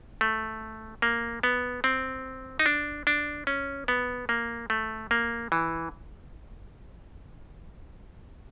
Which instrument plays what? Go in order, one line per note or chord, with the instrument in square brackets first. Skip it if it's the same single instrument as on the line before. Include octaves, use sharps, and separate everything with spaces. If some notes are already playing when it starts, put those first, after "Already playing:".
[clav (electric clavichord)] A3
A#3
B3
C4
D#4
D4
D4
C#4
B3
A#3
A3
A#3
E3